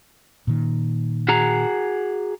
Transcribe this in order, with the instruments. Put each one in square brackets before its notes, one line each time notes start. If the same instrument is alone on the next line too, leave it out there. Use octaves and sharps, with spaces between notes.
[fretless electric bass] A#2 D#3
[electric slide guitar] F#4 G#4 A#5